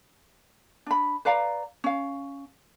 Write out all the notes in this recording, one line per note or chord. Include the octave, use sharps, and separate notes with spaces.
D4 B5
B4 D5 F5 A#5
C#4 F5